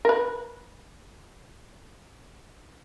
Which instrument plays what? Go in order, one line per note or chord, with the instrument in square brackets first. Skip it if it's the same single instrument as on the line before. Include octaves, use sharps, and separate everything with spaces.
[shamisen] A#4 B4